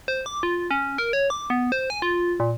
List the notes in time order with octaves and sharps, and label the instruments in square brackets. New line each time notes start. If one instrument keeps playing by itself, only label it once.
[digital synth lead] C5
D6
F4
C#4
A#4
C#5
D6
B3
C5
G#5
F4
A#2